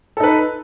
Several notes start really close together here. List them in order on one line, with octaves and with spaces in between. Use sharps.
A4 D#4 B4